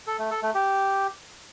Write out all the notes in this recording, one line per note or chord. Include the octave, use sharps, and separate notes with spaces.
A4
A3
A4
A3
G4